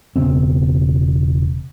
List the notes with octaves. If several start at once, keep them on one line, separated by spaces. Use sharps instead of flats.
E1 C#3 B3 C4